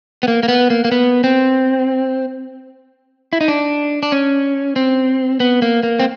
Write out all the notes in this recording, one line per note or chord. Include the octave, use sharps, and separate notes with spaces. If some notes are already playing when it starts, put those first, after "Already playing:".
B3
A#3
A#3
B3
A#3
A#3
B3
C4
E4
D#4
D4
D4
C#4
C4
B3
A#3
A#3
C4